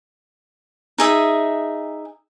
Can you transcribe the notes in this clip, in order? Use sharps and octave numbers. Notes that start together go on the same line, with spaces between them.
D#4 G#4 E5